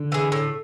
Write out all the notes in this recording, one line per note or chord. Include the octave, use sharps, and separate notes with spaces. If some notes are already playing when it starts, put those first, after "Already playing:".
Already playing: D3
E3 G#3
A2